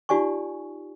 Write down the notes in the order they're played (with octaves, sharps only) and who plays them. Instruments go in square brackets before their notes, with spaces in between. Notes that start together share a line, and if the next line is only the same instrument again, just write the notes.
[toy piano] D#4 F4 G4 D5 G#5 C#6